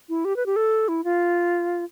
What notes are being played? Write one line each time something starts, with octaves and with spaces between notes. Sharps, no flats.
E4
G4
B4
G4
A4
E4
F4